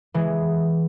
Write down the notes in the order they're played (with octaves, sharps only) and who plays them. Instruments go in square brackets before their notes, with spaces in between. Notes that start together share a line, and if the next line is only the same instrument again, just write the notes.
[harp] E3 G#3